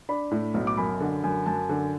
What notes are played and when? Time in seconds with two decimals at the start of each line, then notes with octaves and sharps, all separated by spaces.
0.09 D4 B5
0.31 A2
0.54 B1
0.67 D6
0.77 F#2 B5
1.00 D3
1.24 F#2
1.46 F#2 A5
1.69 D3